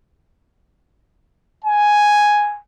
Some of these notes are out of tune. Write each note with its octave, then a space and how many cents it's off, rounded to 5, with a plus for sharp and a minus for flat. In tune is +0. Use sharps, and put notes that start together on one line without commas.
G#5 +0